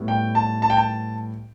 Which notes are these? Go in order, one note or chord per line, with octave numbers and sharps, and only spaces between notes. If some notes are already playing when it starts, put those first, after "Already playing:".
Already playing: A2 G3 B3
G5
A5
A5
G5
A5